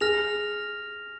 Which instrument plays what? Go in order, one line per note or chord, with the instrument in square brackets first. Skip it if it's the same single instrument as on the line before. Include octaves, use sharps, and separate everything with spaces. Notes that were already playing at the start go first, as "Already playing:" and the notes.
[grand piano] G#4 [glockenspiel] F6 A#6 F7